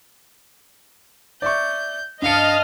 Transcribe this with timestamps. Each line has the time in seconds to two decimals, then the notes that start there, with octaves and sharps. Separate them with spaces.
1.42 D5 E5 C#6 G6
2.22 G2 D#5 F5 A5 D#6 F6 C#7